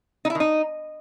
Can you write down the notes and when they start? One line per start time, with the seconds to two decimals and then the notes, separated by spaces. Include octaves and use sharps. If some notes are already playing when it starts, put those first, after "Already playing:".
0.25 D#4
0.30 E4
0.35 D#3
0.40 D#4